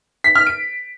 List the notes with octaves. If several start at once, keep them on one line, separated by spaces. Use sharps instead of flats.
B6
F6
D7